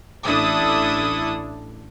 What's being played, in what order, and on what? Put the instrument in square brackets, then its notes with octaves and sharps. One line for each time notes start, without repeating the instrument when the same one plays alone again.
[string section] A1 D4 E4 A4 D#6